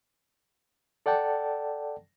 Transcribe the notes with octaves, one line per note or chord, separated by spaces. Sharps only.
A4 D5 F#5 G5 A5